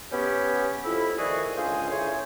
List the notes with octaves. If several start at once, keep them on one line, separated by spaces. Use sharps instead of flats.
B3 C#4 G4
F2 E4
D#3 F3 A3 F#4 G#4 D5
C#2 D3 F4 G#4 C5 G#5
C#4 E4 G#4 C5 C#5